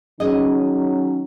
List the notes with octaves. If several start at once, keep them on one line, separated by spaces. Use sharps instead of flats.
D#3 F#3 C#4 G#4 D#5